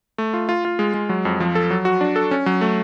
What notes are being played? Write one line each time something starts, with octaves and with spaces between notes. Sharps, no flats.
A3
F4
F4
F4
G#3
G#3
F#3
F2
F3
A4
F#3
F#4
D4
A4
C#4
F#3
A3